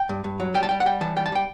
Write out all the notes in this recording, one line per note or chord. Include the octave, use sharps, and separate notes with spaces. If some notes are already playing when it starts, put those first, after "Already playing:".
Already playing: G5
G2
G2
F#3
G3 G5
A5
G3 G5
F#5
G3 G5
E3 A5
G3 G5
A5
G3 G5